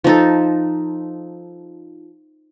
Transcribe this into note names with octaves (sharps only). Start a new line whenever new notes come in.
F3 D#4 A4